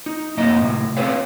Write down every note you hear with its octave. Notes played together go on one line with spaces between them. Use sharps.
D#4
F#2 C3 A#3 D#4 D#5 A#5
A2 C3
C4 C#4 A4 B4 C#5 F5